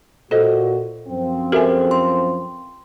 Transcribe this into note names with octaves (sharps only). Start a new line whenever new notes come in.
A#2 F#4 A4 C5 D#5
F#2 F3 C4
F#4 G4 A4 A#4 E5 G#5
C6